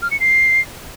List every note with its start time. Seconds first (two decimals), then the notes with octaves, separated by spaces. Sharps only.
0.02 F6
0.11 C#7
0.20 C7